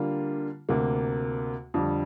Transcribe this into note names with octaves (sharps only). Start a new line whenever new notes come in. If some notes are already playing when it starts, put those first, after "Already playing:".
Already playing: D3 G3 A#3 F4
D2 C3 A#3
F2 D3 G3